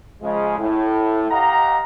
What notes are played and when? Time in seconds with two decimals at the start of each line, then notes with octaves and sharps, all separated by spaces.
0.22 C#3 F3 G#3
0.59 A2
1.31 G4 D#5 F5 F#5 A#5